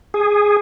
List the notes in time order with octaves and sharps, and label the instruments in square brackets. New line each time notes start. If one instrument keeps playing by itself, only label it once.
[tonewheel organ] G#4